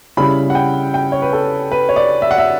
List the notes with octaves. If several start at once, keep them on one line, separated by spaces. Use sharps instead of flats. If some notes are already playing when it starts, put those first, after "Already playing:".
C#3 G3 C#4 E4 B5
F#5
G5
G5
C#5
B4
A4
B4
C#5
D5
E5
F#5
E5